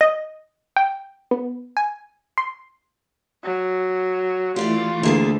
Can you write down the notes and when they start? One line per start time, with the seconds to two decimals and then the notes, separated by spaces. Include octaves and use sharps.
0.01 D#5
0.77 G5
1.31 B3
1.77 G#5
2.38 C6
3.44 F#3
4.56 E3 A3 F4 G4 D5 F5 A6
5.03 D2 A#3 G#4 A4